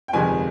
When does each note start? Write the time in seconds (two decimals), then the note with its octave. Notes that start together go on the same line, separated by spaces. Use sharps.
0.08 G5
0.13 G1 F2 C3 D#3 G#3 G#5